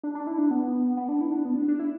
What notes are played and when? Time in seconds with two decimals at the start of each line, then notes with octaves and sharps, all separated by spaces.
0.03 D4
0.15 D4
0.27 E4
0.38 D4
0.51 B3
0.97 B3
1.09 D4
1.21 E4
1.32 D4
1.45 B3
1.56 D4
1.68 D4
1.79 E4